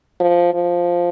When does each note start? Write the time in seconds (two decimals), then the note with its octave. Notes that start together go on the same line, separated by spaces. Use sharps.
0.20 F3
0.54 F3